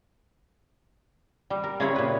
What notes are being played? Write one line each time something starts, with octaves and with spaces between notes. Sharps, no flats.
G3
A#4
C#3 C4 E4 G#4 C#5 B5
A#2 B4